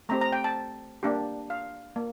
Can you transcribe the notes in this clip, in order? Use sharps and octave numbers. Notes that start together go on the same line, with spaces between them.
A3 C4 G4 A#5
A#5
G5
A5
A#3 D4 G4
F5
A#3